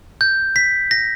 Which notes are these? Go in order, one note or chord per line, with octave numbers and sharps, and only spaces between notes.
G6
B6
A#6